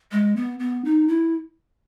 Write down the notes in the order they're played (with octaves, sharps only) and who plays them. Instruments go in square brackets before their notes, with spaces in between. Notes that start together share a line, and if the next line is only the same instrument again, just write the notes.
[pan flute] G#3
B3
B3
D#4
E4